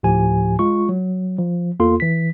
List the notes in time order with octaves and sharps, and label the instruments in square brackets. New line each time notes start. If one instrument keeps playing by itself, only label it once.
[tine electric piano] D2 A2 F3 G4 G#5
G#3 F4 C#6
F#3
F3
E2 A#3 F4 A4 C6
E3 B6